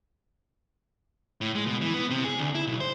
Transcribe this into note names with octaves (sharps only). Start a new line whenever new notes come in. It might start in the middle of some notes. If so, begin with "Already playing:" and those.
A2
G#3
B2
E3
B3
C3
G#4
D2
E4
B1
C5